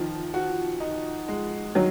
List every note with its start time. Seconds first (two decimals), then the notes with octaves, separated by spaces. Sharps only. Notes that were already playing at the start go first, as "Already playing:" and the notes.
Already playing: D#3 F3
0.34 F#4
0.80 D#4
1.28 G#3
1.75 D#3 F#3